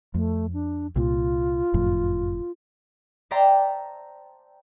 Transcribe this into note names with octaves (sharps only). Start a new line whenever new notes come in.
F2 A3
D4
C2 A#2 F4
F#1 F2 A2
C5 D5 E5 G5 A5 A#5